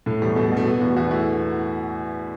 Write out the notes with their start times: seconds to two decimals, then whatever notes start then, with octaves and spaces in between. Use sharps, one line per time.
0.06 A2 A3
0.22 E2 G3
0.36 B2 A3
0.47 A3
0.52 B2
0.57 A3
0.66 B2 B3
0.81 E2 F#4
0.96 E2 F#4
1.11 A3 E4